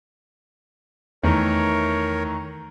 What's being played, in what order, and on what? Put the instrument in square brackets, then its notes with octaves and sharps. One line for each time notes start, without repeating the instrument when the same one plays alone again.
[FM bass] E2 [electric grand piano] D#3 E3 A3 [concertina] A#4 C#5